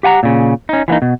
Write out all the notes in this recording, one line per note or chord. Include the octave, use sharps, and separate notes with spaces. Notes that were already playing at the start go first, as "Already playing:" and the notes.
G4 F#5 G#5 A#5
A#2 C#3
C#4 D#4
E3 F#3 A#3 D#4
B2